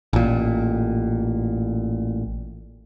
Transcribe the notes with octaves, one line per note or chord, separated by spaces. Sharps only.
A1 A#2